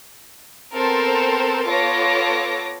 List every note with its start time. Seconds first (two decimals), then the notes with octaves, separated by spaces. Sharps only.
0.73 B3 C4 A4 A#4 C5
1.67 B3 F4 A4 C#5 D6 A#6